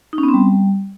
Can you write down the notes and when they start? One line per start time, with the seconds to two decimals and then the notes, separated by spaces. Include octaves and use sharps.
0.13 D#4
0.18 C#4
0.23 B3
0.29 C4
0.34 G3